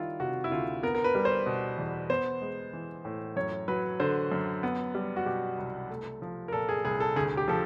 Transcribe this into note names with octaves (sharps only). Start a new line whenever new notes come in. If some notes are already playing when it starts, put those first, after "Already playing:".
Already playing: D#3 G3 E4 F4
C3 F#4
E4
D2 F4
B3 A#4
A#4
B4
G3
C5
B2
E2
B3 C5
G#3
E3
A2
F#2 C#5
F#3 B4
D3 C5
F#2
B3
G3
F#4
B2 G4
C2
A3
F3
A#4
A#2 A4
G#4
C2 G#4
A4
D2 G#4
G4
F3 A4